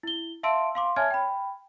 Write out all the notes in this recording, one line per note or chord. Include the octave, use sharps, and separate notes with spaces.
E4 G7
E5 F5 A5 C6 E6 D7
F5 C6 D6
C#5 E5 G#5 A5 F6 G#6
G5 B5